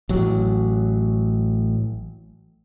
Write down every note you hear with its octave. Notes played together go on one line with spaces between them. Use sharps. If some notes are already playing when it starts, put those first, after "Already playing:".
A1 F#3